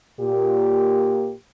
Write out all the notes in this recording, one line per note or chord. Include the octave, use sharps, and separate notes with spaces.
A#2 G4